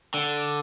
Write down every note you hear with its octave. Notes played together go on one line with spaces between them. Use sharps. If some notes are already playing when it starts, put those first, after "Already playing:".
D3